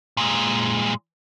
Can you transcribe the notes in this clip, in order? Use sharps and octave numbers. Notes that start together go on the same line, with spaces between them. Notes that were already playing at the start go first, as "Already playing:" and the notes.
A#2 G#3